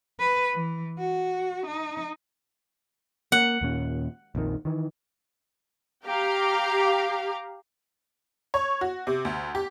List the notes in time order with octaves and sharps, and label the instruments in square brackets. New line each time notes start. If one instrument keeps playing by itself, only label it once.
[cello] B4
E3
F#4
D#4
[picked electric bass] A#3 [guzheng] F#5
[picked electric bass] D#2 A#2 C#4
A#1 F2 D#3
D#3 E3
[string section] G4 F5 A#5
[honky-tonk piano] C#5
F#4
C3
D2
G4